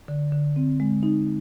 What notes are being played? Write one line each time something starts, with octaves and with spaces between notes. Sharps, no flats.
D3
D3
C4
G#3
D#4